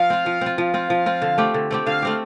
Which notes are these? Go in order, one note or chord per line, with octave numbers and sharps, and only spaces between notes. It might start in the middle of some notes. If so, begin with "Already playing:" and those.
Already playing: F3 F5
C4 F4
F3
C4 F4
F3 F5
C4 F4
F3
C4 F4
D3
A3 C4 G4
D3
A3 C4 G4
D3 F5
A3 C4 G4